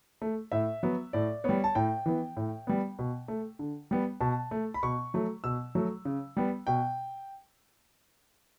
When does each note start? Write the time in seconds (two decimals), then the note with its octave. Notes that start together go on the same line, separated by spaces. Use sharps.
0.22 A3
0.52 A2 E5
0.83 F#3 B3
1.13 A2 D5
1.44 G3 B3 C#5
1.64 A5
1.75 A2 G5
2.06 E3 B3
2.37 A2
2.67 G3 B3
2.99 B2
3.28 A3
3.59 D3
3.91 G3 B3
4.21 B2 A5
4.51 A3
4.74 B5
4.83 B2 C#6
5.14 F#3 A3
5.44 B2 E6
5.75 F#3 A3
6.05 C#3
6.37 G3 B3
6.67 B2 G5